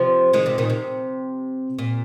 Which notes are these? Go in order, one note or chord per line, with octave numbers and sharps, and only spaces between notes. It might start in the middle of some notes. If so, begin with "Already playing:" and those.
Already playing: C3 F3
D#3 G#3
C3 F3
A#2 D#3
C3
A#2